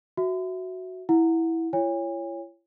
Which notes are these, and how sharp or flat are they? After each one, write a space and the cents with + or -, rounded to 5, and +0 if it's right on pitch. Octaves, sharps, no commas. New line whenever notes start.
F#4 +0 E5 +0
E4 -5 F#5 -20
E4 +45 C#5 +0 G#5 -40